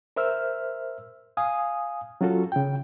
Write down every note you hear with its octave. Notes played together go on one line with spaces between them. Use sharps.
A#4 C5 E5 E6 F6
F5 G#5 D#6
F#3 C#4 F4 F#4 A4
C#3 G5